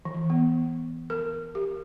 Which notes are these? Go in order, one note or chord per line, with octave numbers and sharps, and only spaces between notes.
E3
B3
A#4
G4